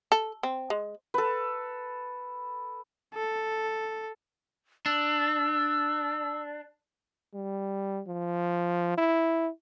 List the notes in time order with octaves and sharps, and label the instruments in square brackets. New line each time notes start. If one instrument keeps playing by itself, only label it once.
[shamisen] A4
C4
G#3
[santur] A4 B4
[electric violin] A4
[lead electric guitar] D4 [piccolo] E6
[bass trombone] G3
F3
E4